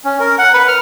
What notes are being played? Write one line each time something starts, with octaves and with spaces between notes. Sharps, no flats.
C#4
A#4
F#5
B4
F6